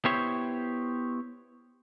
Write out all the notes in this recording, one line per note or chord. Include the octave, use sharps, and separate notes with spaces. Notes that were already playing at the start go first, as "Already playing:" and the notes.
B3 E4 G4 C5 C#5